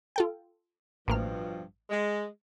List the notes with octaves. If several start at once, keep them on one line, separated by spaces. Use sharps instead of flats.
F4 A4 G5
A1 G2 B2 F3 A#3 F6
G#3